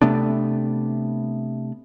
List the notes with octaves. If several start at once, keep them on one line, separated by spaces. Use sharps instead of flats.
C3 A3 B3 D4